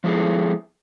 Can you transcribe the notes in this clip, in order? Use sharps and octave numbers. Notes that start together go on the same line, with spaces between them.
F3 G#3 B3 E4 G#4 A4